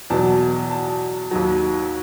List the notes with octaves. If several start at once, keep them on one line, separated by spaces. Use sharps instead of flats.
E2 B2 F#3 A5
A5
D#2 D#3 F#3